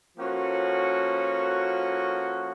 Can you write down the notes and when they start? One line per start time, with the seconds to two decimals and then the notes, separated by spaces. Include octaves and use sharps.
0.18 F3 A#3 C#4 F#4 A4